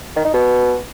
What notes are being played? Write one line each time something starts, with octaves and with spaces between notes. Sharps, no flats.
D#3
D#4
B2